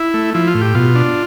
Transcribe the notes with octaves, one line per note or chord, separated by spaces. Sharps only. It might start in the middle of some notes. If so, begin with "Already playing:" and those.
Already playing: E4
A3
F3 E4
F4
A2
G4
B2 F4
D4